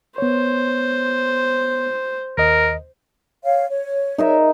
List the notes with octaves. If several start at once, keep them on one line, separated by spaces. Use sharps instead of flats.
B3 C5 C#5
D#2 A#4 D#5
C#5 F5
C#5
D#4 A#4 E5